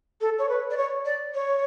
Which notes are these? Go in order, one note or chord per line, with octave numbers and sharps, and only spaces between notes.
A4
C#5
B4
D5
C#5
D5
C#5